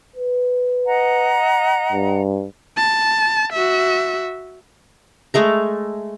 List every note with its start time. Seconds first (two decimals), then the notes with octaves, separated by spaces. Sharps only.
0.16 B4
0.86 D#5 F#5 A#5
1.93 G2
2.77 A5
3.53 F#4 E5
5.34 G#3 A3 A#5